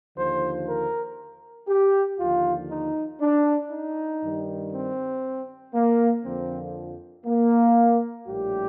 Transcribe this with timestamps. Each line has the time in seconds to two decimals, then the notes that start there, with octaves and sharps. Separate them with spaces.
0.16 D#2 D3 F3 C5
0.67 A#4
1.67 G4
2.18 D#2 D3 F3 F4
2.69 D#4
3.21 D4
3.70 D#4
4.22 G2 D#3 G3
4.72 C4
5.74 A#3
6.24 F2 D3 F3 C4
7.26 A#3
8.26 A#1 A2 G3 G4